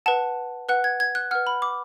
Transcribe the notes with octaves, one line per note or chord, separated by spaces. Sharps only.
B4 F#5 A5
B4 F#5 F#6
G#6
G#6
F#6
B4 F#5 F6
B5
D6